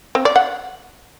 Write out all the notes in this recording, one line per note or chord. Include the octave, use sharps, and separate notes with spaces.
C4
D5
F#5